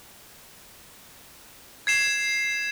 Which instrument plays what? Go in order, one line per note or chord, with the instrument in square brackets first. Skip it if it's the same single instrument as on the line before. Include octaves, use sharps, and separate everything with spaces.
[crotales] G#6 C7 E7